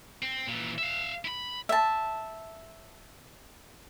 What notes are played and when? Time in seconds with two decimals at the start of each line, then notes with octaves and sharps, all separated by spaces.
0.23 C4
0.48 A#2 E3
0.78 E5 F5
1.25 E4 B5
1.69 E5 A5